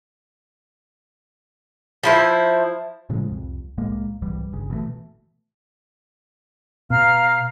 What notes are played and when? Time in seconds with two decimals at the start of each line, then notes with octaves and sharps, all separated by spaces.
2.03 F3 E4 C5
3.10 A2 C#3 F3 G#3
3.29 C2 F2
3.78 C2 A2 G#3 A#3
4.22 C2 G#2 E3 G3
4.52 G1 C#3
4.70 B2 E3 G3 A3
6.90 B2 F5 A#5 F6